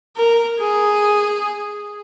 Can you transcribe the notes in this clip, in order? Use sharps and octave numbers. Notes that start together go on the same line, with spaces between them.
A#4
G#4